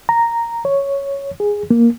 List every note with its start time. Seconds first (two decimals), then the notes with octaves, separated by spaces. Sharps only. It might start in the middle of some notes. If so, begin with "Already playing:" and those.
0.09 A#5
0.65 C#5
1.40 G#4
1.71 A#3